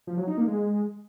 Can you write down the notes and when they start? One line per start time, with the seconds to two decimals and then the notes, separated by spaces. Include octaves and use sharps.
0.07 F3
0.17 F#3
0.27 D#4
0.37 A#3
0.48 G#3